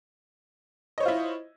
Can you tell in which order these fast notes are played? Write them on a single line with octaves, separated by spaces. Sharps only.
D#5 C#5 C5 F4 E4